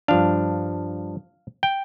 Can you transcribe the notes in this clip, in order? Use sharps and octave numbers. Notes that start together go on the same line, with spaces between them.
G2 F3 D4 F5
G5